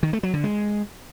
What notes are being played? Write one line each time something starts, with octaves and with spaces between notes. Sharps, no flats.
D#3
A3
F#3
D3
G#3